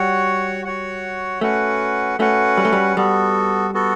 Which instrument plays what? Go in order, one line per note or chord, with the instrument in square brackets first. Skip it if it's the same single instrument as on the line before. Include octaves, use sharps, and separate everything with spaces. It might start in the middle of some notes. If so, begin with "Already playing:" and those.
Already playing: [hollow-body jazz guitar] G3 [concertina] F#4 C#5 F#5
[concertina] F#4 C#5 F#5
[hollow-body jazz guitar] A3 [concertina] C#4 F#4 B4 F#5
[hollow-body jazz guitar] A3 [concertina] C#4 F#4 B4 F#5
[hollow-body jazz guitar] G3
A3
G3
[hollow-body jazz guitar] G3 [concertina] B3 F#4 A4
[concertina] B3 F#4 A4